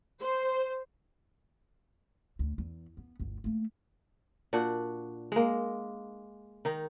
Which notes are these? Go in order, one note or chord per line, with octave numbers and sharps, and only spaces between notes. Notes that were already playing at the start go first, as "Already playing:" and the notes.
C5
D2
E2
B3
G1 D2
A3 A#3
A#2 D4 F#4 F#5
G#3 A#3
D#3 D#4